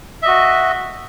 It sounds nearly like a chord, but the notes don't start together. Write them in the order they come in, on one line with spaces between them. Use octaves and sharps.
E5 D#5 F#4